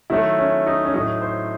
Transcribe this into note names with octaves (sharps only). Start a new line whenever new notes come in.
D#3 F#3 A3 E4
C#4
D#4
C#4
A2 F#3 A3 D#4
C5